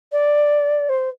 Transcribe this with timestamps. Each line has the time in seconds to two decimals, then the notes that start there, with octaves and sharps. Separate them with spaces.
0.12 D5
0.89 C5